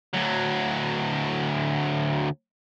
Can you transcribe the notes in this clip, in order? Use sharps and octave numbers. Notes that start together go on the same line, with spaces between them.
D2 F#3